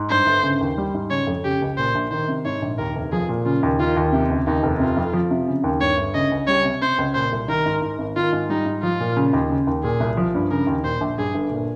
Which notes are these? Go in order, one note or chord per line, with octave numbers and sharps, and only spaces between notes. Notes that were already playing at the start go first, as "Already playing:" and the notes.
Already playing: G#2
G2 C5
G1
C#3
D#2
G3
G#2
C#3 C#5
F2
C#3 G4
C#2
A#2 C5
A#1
D#3 C5
C3
G#2 C#5
A#1
D#2 A#4
F1
F3 G#4
A#2
C#3 F4
D#2
D#3 F4
D#2
C3 G4
C#2
D#2 D#4
F1
C3 F4
F2
F3
C3
C#3
D#2
G2 C#5
G1
C#3 D#5
C#2
G3 C#5
C3
C3 C5
C#2
A#2 C5
C2
D#3 A#4
G#2
G#2
G#1
D#3 F4
G#2
G3 D#4
G#2
F3 F4
A#2
C#3
D#2
C#3
D#2
A#2 G#4
C2
F3
G2
C#3 A#4
D#2
A#2 C5
A#1
G2 G#4
G1
A#2